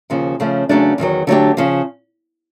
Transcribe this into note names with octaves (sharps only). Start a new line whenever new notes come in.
D#2 C#3 F3
C#3 F3 A3 C#4
E2 C#3 F#3 A3 D4
E2 C3 D#3 F#3
D3 F#3 A3 D4 G4
C#3 F3